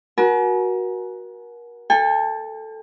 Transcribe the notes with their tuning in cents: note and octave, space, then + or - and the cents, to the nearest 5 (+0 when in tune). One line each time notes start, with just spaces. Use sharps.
F#4 +0 A#4 +35 G#5 +45
A4 +0 G5 +45